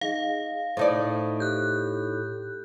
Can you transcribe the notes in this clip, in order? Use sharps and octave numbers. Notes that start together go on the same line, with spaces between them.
D#4 G#4 D#5 F5
A2 D#4 C5 D5 E5 A5
G4 F#6 G6